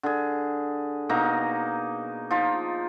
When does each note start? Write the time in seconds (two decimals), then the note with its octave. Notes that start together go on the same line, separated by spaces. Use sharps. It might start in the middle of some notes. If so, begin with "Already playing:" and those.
0.03 D3 G#4
1.09 B2 A#3 D#4 A#5
2.31 F3 D#4 F4